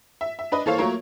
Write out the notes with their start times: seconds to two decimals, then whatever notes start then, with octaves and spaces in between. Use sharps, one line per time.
0.21 E5
0.39 E5
0.52 D4 B4 D#5
0.66 E3 A#3 A4 C5 C#5 F5
0.78 F#3 A3 A#3 F4 A#4 C#5